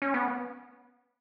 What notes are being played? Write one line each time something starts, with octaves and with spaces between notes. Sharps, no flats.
C#4
B3